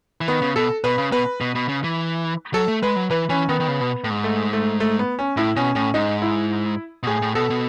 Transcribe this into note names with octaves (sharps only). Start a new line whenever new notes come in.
E3
D#3 B3
C#3
B2 A4
B2 B4
C#3
B2 B4
B2
B2
C#3
E3
F#3 A4
A3
G#3 B4
F#3
E3 B4
E3 C#4
D#3 B3
D#3
C#3
B2
A2
G#2
A3
A3
A3
B3
C#4
A2 E4
B2 C#4
A2 C#4
G#2 D#4
E4
B2
A2 G#4
A2
B2 A4
B2